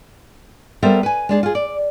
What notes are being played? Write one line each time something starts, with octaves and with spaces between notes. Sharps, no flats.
G3 B3 A4 A#4 C5 E5
B4 G#5
G#3 D4 G#4
F4 G#4
D5